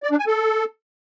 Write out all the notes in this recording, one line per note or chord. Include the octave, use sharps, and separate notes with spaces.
D5
D4
G#5
A4